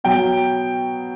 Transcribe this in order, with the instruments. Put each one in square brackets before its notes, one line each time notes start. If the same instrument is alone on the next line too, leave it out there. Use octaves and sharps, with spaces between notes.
[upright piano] B2 F#3 G5